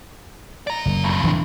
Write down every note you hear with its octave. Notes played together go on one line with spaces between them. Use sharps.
D5 A#5
F#1
F2 A2
E1 E3 D4